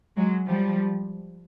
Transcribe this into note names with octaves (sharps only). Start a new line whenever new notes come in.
F#3 G#3
F3 G3